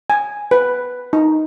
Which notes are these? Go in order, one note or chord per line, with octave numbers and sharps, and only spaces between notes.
G#5
B4
D#4